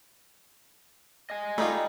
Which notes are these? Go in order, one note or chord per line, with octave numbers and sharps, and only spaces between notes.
D#5 G#5
G3 A3 D#4 F4